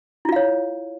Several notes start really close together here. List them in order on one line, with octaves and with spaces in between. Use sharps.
E4 F4 F5 C#5